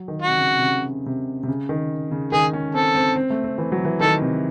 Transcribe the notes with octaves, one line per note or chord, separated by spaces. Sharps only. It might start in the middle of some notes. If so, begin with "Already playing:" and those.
Already playing: F#3
D#3
F#4
C3
C#3
C3
C#3
C3
C3
C#3
D#3
C#3
D#3 G#4
C#4
C4 A4
C4
C4
A3
C4
E3
F#3
E3
D#3 A4
C3